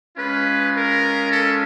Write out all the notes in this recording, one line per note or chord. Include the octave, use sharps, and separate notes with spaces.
G#3 C#4 F4 B4
A#4
A4